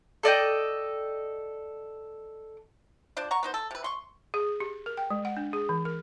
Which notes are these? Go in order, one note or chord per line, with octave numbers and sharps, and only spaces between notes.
A4 D5 D#5 G5
F3 D4 C5 D5
F#5 A#5 C#6
B3 D#4 C5
A4
C3 B4
C6 C#6
G#4
G4
A#4
G5
G#3
F#5
D4
G#4
E3
A#4